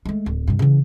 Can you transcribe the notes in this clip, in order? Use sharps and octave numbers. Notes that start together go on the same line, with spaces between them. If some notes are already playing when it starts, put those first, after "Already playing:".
G#3 A3
D1
G2 B2
C#3 E3